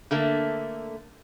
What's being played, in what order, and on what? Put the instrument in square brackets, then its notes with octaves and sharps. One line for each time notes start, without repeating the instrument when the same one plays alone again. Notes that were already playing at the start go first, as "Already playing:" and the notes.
[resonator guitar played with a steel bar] D3 A3 A#3